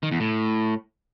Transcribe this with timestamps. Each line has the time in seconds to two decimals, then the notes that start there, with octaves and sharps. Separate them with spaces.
0.03 D#3
0.11 E2
0.20 A2